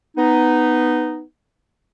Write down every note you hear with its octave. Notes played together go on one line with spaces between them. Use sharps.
B3 D#4